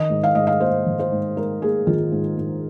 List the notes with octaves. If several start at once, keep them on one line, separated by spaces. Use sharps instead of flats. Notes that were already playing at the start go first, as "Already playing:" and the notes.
Already playing: D#3 D#5
G#2
F5
G#2 D#5
F5
A#3 C5
D#3
C5
G#2
G#2 A#4
A#3 G#4
D#3 F4
G#2
G#2